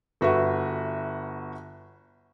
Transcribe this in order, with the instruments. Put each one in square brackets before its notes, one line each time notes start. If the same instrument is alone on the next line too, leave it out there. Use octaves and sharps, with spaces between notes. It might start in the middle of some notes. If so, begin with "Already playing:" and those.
[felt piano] G1 F#4 B4 E5